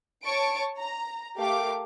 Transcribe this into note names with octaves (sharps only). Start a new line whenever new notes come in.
C#5 A5 C#6 D7
A#5
A3 G4 A#4 F5 D6